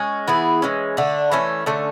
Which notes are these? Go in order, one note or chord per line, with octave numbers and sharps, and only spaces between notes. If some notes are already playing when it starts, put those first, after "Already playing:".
Already playing: G#3 C#4
E3 B3 E4 G#4
E3 G#3 C#4
D3 A3 D4
E3 A3 C#4
D3 A3 C#4